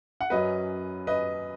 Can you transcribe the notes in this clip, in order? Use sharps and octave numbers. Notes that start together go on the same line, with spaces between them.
F#5
F#2 F#3 C#4 B4 D#5
B4 D#5